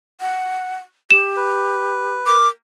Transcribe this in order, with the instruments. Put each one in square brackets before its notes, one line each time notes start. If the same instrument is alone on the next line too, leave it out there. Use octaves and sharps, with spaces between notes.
[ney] F#5
[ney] G4 [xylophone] E7
[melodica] B4
[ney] A#4 [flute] D6